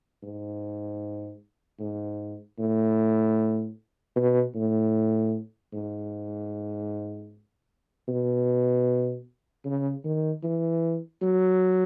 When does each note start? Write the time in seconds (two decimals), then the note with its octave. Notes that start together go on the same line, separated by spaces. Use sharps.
0.23 G#2
1.80 G#2
2.59 A2
4.16 B2
4.55 A2
5.73 G#2
8.08 B2
9.65 C#3
10.04 D#3
10.43 E3
11.22 F#3